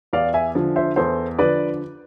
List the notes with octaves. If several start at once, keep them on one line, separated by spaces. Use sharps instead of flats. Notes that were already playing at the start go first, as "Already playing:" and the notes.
E2 D5 F5
E5 G#5
D3 F3
C5 E5
E2 A4 C5
D3 F3 B4 D5